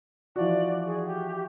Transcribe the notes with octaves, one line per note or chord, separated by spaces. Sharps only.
E3 F3 F#4 D5
G#4
G4